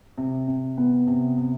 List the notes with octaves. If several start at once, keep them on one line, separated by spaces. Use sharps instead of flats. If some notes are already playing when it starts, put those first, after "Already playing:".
C3
C3
B3
C3
C3